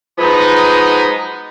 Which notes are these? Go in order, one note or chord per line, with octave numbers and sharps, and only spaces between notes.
F3 F#3 G#3 B3 D#4